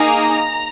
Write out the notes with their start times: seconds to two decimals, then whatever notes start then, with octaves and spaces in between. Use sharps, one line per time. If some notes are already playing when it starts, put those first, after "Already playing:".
Already playing: A#3 D#4 G#4 A#5